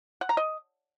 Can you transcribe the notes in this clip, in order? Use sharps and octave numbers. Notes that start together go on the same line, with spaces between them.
F#5
A#5
D#5